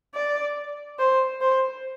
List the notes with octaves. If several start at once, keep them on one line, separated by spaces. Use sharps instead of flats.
D5
C5
C5